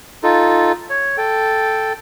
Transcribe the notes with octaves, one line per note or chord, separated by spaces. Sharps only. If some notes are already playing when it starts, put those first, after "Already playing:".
D#4 F4 A4
C#5
A4 G5